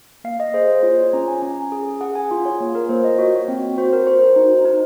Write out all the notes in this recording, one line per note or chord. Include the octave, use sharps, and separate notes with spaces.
A#3 F5
D#5
G#4 C5
C5
F4 C#5
C#4 A#5
G#5
C#4 G#5
G#4
G#4 F#5
G#5
F4 F5
C#5
A#3
A#4
A#3 C5
D#5
F#4 C#5
C4
F#4 C5
A#4
F#4 C5
C5
D#4
D#4